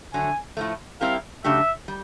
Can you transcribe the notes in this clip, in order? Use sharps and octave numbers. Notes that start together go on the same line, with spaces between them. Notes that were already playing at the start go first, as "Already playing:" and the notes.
D3 F#3 A3 G#5
A2 F3 A3
G3 C4 E4 G4 A#4 F5
C#3 F#3 A3 D4 G4 E5
G3